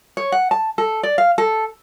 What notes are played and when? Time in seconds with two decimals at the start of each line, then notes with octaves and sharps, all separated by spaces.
0.17 C#5
0.32 F#5
0.51 A5
0.78 A4
1.03 D5
1.18 F5
1.38 A4